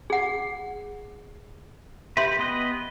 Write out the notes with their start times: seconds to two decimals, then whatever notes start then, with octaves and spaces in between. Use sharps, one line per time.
0.10 G#4 F#5
2.17 G4 B4 E5 C6
2.39 B3 B4 D#5